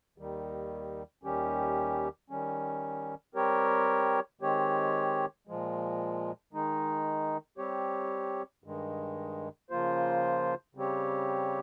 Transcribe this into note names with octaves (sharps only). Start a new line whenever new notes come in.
D#2 D#3 G3
D#2 D#3 G3 C#4 G4
D#3 G3 C#4
G3 C4 G4 A#4 C#5
D#3 G#3 C4 G4 C#5
A#2 F3 G#3
D#3 G#3 D#4
G3 C4 G4 C#5
G2 D#3 G#3
C#3 F3 A#3 F4 C5
C#3 G3 C4 G4 C#5